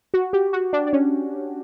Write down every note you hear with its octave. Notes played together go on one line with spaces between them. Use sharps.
F#4
G4
F#4
D4
D4
C#4